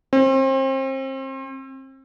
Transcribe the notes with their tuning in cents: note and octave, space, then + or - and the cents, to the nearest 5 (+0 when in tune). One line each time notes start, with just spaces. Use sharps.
C4 +35